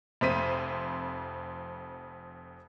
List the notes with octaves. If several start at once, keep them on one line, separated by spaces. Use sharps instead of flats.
F1 F2 C5 B6 D#7